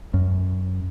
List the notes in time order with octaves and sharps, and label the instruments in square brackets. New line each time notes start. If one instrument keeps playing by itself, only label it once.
[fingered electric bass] F#2